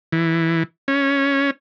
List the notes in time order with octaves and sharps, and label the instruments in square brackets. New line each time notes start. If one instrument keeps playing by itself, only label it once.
[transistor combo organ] E3
C#4